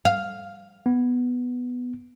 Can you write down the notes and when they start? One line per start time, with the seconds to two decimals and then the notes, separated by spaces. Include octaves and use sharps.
0.05 F5
0.86 B3